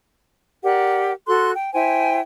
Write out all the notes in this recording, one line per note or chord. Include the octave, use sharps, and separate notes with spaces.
G4 A#4 D5 F#5
F#4 A4 C6 F#6
G5
E4 C5 G5 G#5